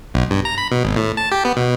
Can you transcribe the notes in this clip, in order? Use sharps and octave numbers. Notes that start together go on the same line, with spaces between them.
B1
G2
A#5
B5
B2
G#1
A2
A5
G4
B3
B2